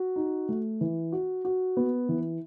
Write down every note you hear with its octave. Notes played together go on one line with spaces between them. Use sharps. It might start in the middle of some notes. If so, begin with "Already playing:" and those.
Already playing: F#4
D#4
A3
E3
F#4
F#4
B3
E3